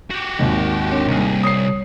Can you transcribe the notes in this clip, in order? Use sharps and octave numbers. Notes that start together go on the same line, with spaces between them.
F#4 G4
G#1 D#2
C4 D4 C#5
C2 G3 A#3 G#4
G3 C#5 D#6 C7